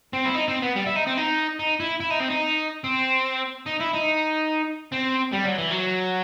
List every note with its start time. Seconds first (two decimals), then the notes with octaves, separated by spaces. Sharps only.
0.13 C4
0.25 E4
0.35 D#4
0.48 C4
0.62 B3
0.76 G3
0.87 E4
0.96 D#4
1.07 C4
1.17 D#4
1.59 D#4
1.80 E4
2.00 E4
2.11 D#4
2.20 C4
2.30 D#4
2.84 C4
3.67 D#4
3.81 E4
3.94 D#4
4.92 C4
5.33 G3
5.45 F#3
5.58 E3
5.71 F#3